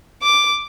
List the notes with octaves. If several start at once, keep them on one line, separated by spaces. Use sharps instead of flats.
D6